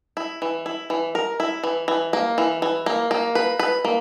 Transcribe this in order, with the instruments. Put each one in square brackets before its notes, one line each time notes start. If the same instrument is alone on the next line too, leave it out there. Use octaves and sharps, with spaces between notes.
[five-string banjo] E4
E3
E4
E3
A#4
E4
E3
E3
A#3
E3
E3
A#3
A#3
B4
B4
A#3